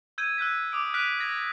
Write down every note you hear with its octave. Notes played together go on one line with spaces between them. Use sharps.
E6 G6 G#6 D#7
E6 F#6 G6 B6
D6 D#6 D7
F6 F#6 B6 D7 D#7
G#6 A#6